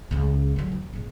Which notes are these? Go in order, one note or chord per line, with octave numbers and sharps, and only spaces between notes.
C#2 C#3
D3 F#3
F2
E2 A#2